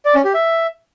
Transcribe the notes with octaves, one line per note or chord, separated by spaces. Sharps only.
D5
C#4
G4
E5